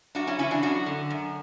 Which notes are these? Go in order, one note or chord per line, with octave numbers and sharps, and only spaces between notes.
F#2 D4 F#4
C#4 E4
C#3 E3 C#4 E4
D4 F#4
F#2 D4 F#4
D3
F#2